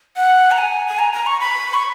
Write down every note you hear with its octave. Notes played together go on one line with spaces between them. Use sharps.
F#5
A#5
G#5
G#5
A#5
A#5
C#6
B5
C#6